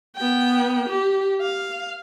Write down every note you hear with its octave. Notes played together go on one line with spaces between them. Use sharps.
B3 G5
G4
F5